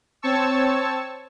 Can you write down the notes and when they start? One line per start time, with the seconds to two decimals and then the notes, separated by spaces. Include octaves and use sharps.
0.22 C4 C#5 A5 C#6 E6